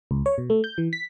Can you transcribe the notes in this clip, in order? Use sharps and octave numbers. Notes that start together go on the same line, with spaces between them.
C#2
C#5
B2
A3
G6
E3
B6